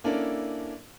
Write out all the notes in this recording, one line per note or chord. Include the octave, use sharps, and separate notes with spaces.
A#3 C#4 D4 E4 A4 A#4